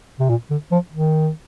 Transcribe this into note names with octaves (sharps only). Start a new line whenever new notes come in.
C3
A#2
D3
F3
D#3